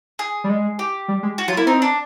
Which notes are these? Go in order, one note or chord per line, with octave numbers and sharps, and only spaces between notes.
G#4
G3
G#3
G4
G3
G#3
F#4
F#3 F4
A#3 E4
C4 D#4
D4